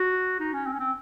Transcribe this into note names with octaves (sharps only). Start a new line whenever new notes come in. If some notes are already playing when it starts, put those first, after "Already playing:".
Already playing: F#4
D#4
C#4
C4
C#4
C4